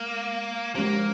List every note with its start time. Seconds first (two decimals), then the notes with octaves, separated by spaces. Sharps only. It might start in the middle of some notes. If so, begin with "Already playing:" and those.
Already playing: G#3 A#3
0.75 F3 G#3 A#3 C#4 G4 C5